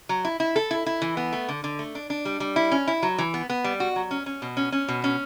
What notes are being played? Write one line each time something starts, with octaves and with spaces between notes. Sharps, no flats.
F#3
E4
E4
A4
E4
E4
E3
B3
A3
D3
D3
A3
D4
D4
G3
G3
E4
C#4
E4
F#3
E3
B3
B3
G3
F#4
F#3
C#4
C#4
B2
C#4
C#4
B2
C#4